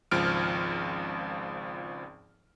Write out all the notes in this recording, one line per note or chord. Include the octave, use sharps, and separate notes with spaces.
G#1 C#2 F3 F6 D7